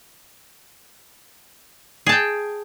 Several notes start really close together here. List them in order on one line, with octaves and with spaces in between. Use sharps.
G#4 A5 G5